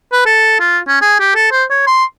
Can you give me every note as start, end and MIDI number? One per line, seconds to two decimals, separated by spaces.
0.13 0.23 71
0.26 0.56 69
0.60 0.79 65
0.87 0.97 61
1.01 1.15 68
1.20 1.33 67
1.35 1.50 69
1.52 1.64 72
1.70 1.85 73
1.87 2.04 84